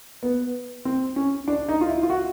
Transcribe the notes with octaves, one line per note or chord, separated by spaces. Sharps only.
B3
C4
C#4
D4
D#4
F4
E4
F4
F#4